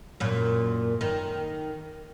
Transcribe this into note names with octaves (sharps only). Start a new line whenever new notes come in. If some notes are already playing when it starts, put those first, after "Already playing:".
F#2 A#2
D#3